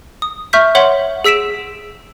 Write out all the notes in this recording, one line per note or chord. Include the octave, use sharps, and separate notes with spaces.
D#6
E5 C#6 F6 G6 B6
C#5 E5 F#5 C6 F#7
G#4 E6 B6 D7 E7